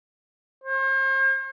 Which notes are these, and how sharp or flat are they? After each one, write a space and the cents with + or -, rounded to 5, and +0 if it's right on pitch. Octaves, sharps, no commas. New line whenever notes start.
C5 +40